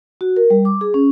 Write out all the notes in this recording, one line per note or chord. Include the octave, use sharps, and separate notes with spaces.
F#4
A#4
G3
D6
G#4
C#4